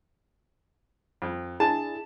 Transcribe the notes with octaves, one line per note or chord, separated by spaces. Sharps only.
F2
D4 E4 G#4 A5